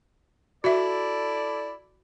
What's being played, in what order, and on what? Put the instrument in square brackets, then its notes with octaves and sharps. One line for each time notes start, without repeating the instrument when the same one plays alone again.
[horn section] E4 A4 D5 [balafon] F#4 E5